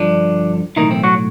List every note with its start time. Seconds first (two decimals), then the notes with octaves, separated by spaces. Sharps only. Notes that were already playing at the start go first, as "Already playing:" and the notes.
Already playing: G2 D3 F3 D4
0.76 B1 A2 D#3 E3 D#4
0.91 C4
1.04 F#3 F#4